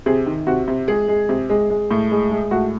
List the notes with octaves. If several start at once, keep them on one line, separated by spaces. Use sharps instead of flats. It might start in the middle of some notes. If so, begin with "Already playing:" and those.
C3 G#4
D#3
C3 F#4
C3
G#3 G#4
G#3
C3
G#3
G#3
A2
G#3
G#3
A2 F#4